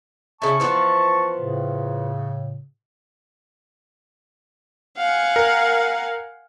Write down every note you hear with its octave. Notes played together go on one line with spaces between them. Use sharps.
C#3 E4 A5 C#6
E3 F3 B3
A2 C#3
F5 F#5 G#5
A#4